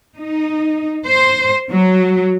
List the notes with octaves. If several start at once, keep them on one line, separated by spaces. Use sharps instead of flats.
D#4
C5
F#3